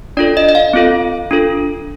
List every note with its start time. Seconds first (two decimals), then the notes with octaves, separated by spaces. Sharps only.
0.17 D4 F4 A4 D5
0.37 D#5
0.49 D#5
0.55 F5
0.73 C4 F4 A4
1.31 D4 F4 A4